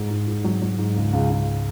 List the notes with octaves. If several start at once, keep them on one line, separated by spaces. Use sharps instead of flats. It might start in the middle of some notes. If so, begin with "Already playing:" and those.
Already playing: G#2
G#2
G#2
F#3
F#3
G#2
C#2
C#2
C#2